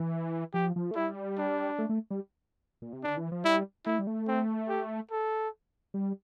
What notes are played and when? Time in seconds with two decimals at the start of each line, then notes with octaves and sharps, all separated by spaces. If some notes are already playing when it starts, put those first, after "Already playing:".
Already playing: E3
0.54 F3 G4
0.76 F3
0.91 A3
0.95 G3 E4
1.38 D4
1.79 A3
1.89 A3
2.11 G3
2.82 A#2
2.93 C3
3.03 D3 D4
3.17 E3
3.32 F3
3.44 G3 E4
3.86 A3 E4
3.99 G3
4.07 A3
4.28 C4
4.69 G4
5.11 A4
5.94 G3